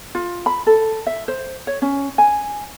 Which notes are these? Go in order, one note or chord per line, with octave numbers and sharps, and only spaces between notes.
F4
B5
A4
E5
C5
C#5
C#4
G#5